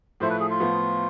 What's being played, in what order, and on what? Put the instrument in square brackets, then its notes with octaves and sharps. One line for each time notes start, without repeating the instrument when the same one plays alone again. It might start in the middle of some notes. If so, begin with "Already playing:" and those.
[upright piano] A2 F3 A3 E4 [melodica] C5
[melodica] B4
G#4
F4
[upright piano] A2 F3 B3